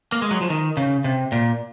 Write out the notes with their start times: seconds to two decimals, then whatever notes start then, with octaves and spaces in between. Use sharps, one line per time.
0.12 A#3
0.22 G#3
0.31 F#3
0.41 F3
0.50 D#3
0.77 C#3
1.04 C3
1.32 A#2